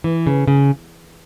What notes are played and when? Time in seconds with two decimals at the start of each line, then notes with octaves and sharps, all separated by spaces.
0.04 E3
0.27 C#3
0.47 C#3